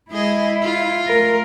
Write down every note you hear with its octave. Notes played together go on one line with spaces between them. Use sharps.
G#3 E4 G#4 D#5
F4
A3 A#4